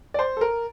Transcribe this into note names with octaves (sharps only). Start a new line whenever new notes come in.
D5
C5
A4
A#4